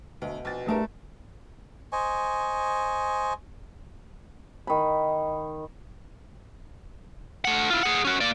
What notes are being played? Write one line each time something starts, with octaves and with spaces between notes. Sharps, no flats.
D2 B2
A#1 A6
E2 G2 A3 A#4 A5
C5 D#5 G#5 C#6
D#3 B5
A3 F#5
E4 F4
G#4 F#5
C#4 F#4
A#3 D5